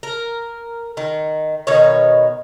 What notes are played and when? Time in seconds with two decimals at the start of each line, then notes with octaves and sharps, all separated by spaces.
0.03 A#4
0.97 D#3
1.67 B2 D#3 D#4 C#5